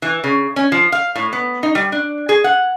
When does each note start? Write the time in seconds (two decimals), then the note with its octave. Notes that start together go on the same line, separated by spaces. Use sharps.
0.02 E3
0.24 C#3
0.56 C#4
0.72 F3
0.92 F5
1.15 A2
1.33 B3
1.63 D#4
1.75 G3
1.92 D4
2.29 G#4
2.44 F#5